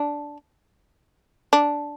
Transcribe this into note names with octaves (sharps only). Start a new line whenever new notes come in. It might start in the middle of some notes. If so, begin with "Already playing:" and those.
Already playing: D4
D4